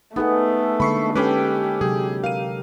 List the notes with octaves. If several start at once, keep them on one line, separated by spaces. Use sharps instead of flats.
A3 B3 D#4 G#4 A4
D3 G#3 A#3 B5 C#6 C7
G#3 C#4 G4 A4 B4 G5 B5 D6
C3 F#3 G#4
A#4 F5 D#7